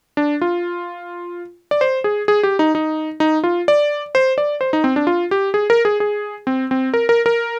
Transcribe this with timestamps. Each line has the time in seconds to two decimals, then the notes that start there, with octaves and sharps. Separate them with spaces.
0.17 D4
0.41 F4
1.71 D5
1.81 C5
2.04 G#4
2.28 G#4
2.43 G4
2.59 D#4
2.75 D#4
3.20 D#4
3.44 F4
3.68 D5
4.15 C5
4.38 D5
4.61 C5
4.73 D#4
4.84 C4
4.96 D4
5.07 F4
5.31 G4
5.54 G#4
5.70 A#4
5.85 G#4
6.00 G#4
6.47 C4
6.71 C4
6.94 A#4
7.09 A#4
7.26 A#4